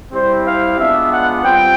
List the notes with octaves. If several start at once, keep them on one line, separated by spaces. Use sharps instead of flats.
G3 C4 E4 G4 C5
F5
G#3 B3 D4 F4 E5
F#5
G3 C4 F4 G5